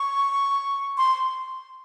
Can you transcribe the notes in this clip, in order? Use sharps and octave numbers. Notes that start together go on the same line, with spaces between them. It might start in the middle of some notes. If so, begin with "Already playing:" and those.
Already playing: C#6
C6